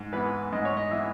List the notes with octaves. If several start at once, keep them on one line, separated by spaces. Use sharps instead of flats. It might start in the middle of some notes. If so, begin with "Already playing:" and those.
Already playing: G#2
E3 B3 B4
G#2 D#5
C#5
D#5
E3 B3 E5